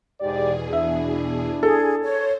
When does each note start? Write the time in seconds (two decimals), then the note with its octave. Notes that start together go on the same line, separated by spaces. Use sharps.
0.20 E2 G#2 B2 G4 G#4 D5
0.73 D4 E4 E5
1.63 G#4 A4
2.03 C5 C#5